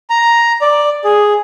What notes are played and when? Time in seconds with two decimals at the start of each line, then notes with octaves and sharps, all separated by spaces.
0.10 A#5
0.61 D5
1.04 G#4